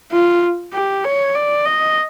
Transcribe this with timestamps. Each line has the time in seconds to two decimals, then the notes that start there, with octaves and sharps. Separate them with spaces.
0.12 F4
0.73 G4
1.05 C#5
1.35 D5
1.66 D#5